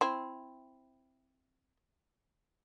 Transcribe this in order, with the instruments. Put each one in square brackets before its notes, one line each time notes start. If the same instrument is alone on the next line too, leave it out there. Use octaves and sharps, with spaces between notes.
[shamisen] C4 E4